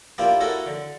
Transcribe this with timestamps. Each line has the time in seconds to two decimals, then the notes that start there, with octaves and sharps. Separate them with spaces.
0.18 A#3 D4 E4 F4 G4
0.40 C#4 E4 F#4 A4 A#4
0.66 D3